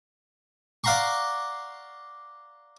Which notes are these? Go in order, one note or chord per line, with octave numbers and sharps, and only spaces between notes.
D5 F5 F#5 A#5 C6 C#6